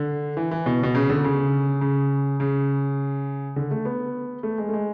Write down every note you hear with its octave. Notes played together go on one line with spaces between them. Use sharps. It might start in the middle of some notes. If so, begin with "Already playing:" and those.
Already playing: D3
E3
E3
B2
B2
C#3
D3
C#3
C#3
C#3
D3
A3
B3
A3
G#3
A3
G#3